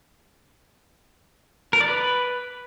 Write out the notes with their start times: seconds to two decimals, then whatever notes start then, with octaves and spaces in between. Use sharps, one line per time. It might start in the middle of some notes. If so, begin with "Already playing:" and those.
1.73 A#4
1.80 D5
1.88 B4